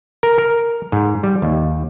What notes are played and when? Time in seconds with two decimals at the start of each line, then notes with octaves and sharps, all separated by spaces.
0.23 A#4
0.38 A#4
0.92 G#2
1.23 G3
1.42 D#2